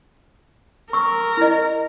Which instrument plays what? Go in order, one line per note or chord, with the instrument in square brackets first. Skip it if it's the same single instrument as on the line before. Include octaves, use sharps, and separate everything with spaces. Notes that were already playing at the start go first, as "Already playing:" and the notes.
[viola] A#4 [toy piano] C#6 E6
[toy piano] E4 D#5